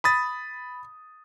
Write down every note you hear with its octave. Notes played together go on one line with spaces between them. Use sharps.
B5 D#6 A6